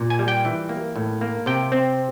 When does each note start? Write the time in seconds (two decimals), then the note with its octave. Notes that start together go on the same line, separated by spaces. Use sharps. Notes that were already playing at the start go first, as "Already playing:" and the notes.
Already playing: A#2
0.10 G#5
0.19 G3
0.28 G5
0.45 E3
0.69 A#3
0.96 A2
1.21 A#3
1.46 C3 G5
1.72 C4